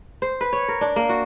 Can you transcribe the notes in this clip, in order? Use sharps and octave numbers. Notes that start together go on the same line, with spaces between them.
C5
B4
C#5
A#4
D4
A#3
F#4